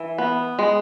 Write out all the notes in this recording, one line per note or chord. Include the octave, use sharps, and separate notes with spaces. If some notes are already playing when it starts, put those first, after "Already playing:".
Already playing: E3
B3
G#3